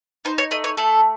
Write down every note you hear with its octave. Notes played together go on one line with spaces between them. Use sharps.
D#4 C5
C#5
A3 D#5
C#5
A3 A4